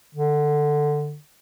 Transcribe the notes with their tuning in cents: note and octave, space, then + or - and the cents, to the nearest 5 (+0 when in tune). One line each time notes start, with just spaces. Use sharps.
D3 +15